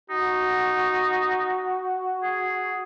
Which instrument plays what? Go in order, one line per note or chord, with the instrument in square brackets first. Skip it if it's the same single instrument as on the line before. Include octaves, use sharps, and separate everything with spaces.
[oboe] D#4 [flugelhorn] F#4
[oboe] G#4